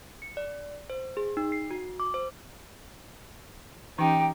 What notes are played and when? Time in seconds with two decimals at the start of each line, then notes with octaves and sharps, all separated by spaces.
0.22 C#7
0.37 D5
0.90 C5
1.17 G#4
1.37 D#4
1.52 C7
1.71 F#4
2.00 D6
2.14 C5
3.99 E3 C#4 D#4 G4 G5